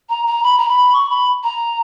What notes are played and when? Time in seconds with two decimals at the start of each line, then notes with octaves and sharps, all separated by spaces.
0.09 A#5
0.26 A#5
0.43 B5
0.57 A#5
0.68 B5
0.92 C#6
1.09 B5
1.43 A#5